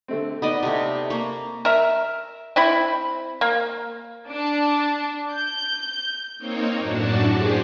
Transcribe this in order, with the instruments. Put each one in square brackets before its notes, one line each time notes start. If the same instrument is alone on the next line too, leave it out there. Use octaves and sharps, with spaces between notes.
[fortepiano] D3 A3 C4
[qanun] B3 D5 D#5 [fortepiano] D#4
[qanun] C3 A3
[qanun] A#3 A#4 [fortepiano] C#6
[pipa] A#4 E5
C4 E4 B5
A#3
[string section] D4
G6
[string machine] A#3 C4 D#4 C#5
F#2 A2 D4 F#4 A5
G4 G#4 C5